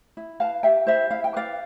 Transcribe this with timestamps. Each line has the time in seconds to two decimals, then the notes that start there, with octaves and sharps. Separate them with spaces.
0.17 E4
0.40 B4 F5 A5
0.63 G4 E5 G5
0.87 E4 C5 E5
1.11 E4 F5
1.24 G5
1.34 B4 D5 F5